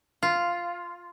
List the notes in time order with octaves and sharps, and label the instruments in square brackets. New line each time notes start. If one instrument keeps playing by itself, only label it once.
[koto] F4